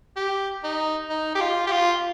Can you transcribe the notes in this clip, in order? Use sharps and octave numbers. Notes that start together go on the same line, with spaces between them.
G4
D#4
D#4
G4
F4
G4
F4